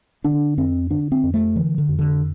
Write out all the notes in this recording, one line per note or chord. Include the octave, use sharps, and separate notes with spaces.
D3 D4
F2 C4
D3 D4
C4
F2
A3
D3 E3
D3
F2
D3